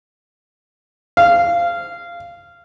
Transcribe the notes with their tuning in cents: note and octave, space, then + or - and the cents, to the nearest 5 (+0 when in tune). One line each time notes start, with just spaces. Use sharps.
F5 -15